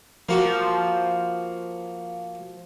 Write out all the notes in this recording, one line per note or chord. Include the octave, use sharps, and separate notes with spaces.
F3 A#3 F#4